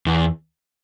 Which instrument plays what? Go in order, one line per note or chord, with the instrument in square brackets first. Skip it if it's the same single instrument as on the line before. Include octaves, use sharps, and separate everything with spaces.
[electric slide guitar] E2